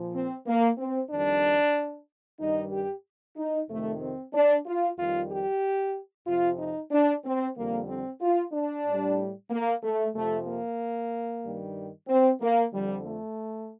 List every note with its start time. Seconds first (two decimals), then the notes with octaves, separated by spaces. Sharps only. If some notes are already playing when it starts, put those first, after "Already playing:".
Already playing: A#2 F3
0.14 C4
0.46 A#3
0.78 C4
1.10 F2 D#3 G3 D4
2.39 G2 D#3 G3 D#4
2.72 G4
3.37 D#4
3.69 F2 C3 D#3 A3
4.01 C4
4.33 D4
4.66 F4
4.98 F2 D#3 G3 F4
5.31 G4
6.26 F2 C3 F3 F4
6.59 D#4
6.91 D4
7.25 C4
7.56 F2 D3 G3 A#3
7.88 C4
8.21 F4
8.53 D4
8.86 A2 G3
9.50 A#3
9.83 A3
10.14 F2 C3 F3 A3
10.47 A#3
11.44 G2 D#3 G3
12.08 C4
12.41 A#3
12.72 F2 D3 F3 G3
13.05 A3